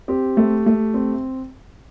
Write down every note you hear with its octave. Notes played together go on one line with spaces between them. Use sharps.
C4 G4
A3
A3
C4